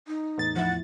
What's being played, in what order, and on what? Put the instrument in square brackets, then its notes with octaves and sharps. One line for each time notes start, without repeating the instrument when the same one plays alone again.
[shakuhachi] D#4
[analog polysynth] E2 A2 A6
[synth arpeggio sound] F3 E4 [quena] F#5